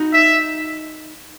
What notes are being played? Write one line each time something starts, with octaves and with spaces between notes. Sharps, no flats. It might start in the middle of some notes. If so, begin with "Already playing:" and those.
Already playing: D#4 F#4
E5